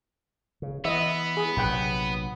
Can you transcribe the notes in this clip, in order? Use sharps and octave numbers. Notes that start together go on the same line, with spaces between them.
C#3
E3 B3 D#5 E5
G#4
A#1 C3 F#3 F#5 G5 B5